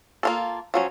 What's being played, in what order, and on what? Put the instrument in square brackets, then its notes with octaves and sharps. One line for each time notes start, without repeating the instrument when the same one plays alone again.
[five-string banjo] A#3 F4 A4
F3 F#3 C#4